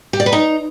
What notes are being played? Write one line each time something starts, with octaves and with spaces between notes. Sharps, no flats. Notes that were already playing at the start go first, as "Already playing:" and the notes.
G4
D5
B4
D#4